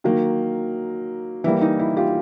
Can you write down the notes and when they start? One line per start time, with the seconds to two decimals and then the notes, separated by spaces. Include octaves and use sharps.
0.04 D#3 F#3 A#3
1.44 E3 G3 A#3 E4
1.61 D#4
1.79 E4
1.97 F4 G4